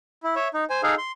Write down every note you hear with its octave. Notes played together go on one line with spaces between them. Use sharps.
E4
C#5 E5
D#4
C5 G#5
D#4 G#4 A4 F5
C6